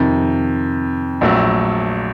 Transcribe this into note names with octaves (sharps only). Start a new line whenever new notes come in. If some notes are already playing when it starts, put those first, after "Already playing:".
Already playing: F2 C3 D#3
A#1 A#2 F#3 A3